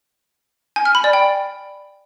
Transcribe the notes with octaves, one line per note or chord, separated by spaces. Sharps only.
G#5
F6
B5
D5
G5